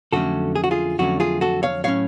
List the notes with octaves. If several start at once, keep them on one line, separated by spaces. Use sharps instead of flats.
F2 D3 F#3 A3 C#4 F#4 A4
G#4
F#4
F4 G#4
F2 D3 F#3 A3 C#4 F#4
F4 G#4
F#4 A4
C#5 F5
A2 F#3 C#4 C#5 F5